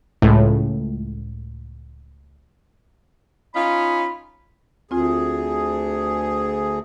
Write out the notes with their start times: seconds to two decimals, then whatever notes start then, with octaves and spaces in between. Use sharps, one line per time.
0.22 C#2 A2
3.55 C#4 D#4 F4 B5
4.91 D2 C4 F4 G#4